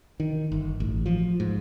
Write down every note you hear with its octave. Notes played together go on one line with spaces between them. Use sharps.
D#3
G1
A1
F3
G#2